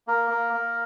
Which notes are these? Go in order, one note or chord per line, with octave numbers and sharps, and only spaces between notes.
A#3 A#4
A#3
A#3